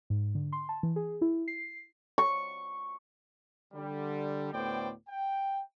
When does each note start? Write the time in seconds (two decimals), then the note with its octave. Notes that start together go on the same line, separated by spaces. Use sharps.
0.10 G#2
0.35 D3
0.52 C6
0.69 A5
0.83 E3
0.96 G#4
1.21 E4
1.48 C7
2.18 C#6
3.74 D3 G3
4.54 D2 A2 B3 C5 D5 G5
5.08 G5